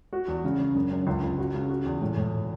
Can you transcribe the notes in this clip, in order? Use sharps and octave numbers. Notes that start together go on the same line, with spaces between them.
F#4
E2
C#3
C#3
F#2
F#2
C#2
C#2
F#4
C#3
F#4
E2
A2
A2